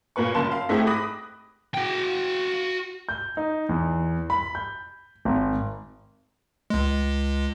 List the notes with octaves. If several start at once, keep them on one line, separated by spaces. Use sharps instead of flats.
A#2 A#3 B4 C#6
F#1 F#2 A#3 A5 C6
F5
G#2 A3 C4 E4 G4 G#4
B5 D6 D#6 F#6 A#6
F#4 G5
G6
D#4
E2
B5
G6
G#1
C#2 G#3